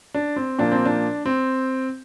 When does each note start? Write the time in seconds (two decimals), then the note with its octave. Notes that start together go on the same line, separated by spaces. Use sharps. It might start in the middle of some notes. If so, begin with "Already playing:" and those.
0.14 D4
0.36 C4
0.59 A#2 F3 A#3 D4
0.72 C4
0.85 D4
1.26 C4